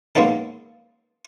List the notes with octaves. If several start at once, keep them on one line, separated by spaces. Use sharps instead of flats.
G#3 A#3 B3 C#4 D#4 A4